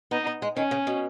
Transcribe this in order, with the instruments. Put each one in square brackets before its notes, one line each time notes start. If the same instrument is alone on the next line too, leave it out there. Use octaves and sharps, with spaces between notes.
[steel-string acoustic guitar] B3 [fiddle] D#4
[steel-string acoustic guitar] B3
G#3
[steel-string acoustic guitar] D#3 [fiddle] C#4
[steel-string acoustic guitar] C#3
B2